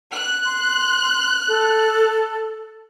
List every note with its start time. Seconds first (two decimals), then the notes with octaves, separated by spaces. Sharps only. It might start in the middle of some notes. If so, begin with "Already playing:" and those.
0.12 F#6
0.45 C6
1.48 A4